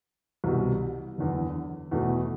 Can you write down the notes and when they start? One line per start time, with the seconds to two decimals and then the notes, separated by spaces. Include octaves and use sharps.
0.44 C2 B2 G3
1.18 F#1 E2 D3
1.91 E2 B2 A3